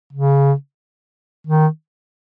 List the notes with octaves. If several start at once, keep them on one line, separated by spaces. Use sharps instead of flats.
C#3
D#3